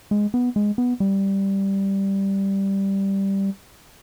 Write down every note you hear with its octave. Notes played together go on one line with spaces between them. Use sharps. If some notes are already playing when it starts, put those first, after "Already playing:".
G#3
B3
G#3
B3
G3